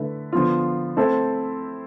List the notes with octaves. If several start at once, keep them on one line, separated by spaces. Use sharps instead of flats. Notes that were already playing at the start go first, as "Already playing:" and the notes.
Already playing: D3 A3 E4 B4
D3 F3 B3 F4
A3 C4 E4 A4 C5